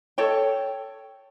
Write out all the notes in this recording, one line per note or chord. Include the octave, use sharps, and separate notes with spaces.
A4 C#5 G5